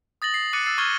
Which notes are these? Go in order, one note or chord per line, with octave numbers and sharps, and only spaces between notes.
D#6 A6 A#6 F#7
C7
D6 F#6 A6 C#7 D#7
E6 A6 C7
C#6 F6 G#6 D#7 G7